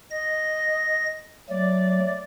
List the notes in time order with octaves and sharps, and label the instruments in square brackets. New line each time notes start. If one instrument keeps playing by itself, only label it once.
[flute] D#5 [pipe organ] A#6
[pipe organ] F#3 A3 [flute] D5